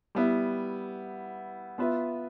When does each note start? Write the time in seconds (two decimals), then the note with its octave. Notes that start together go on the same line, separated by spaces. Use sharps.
0.15 G3 B3 E4
1.78 B3 F4 B4 E5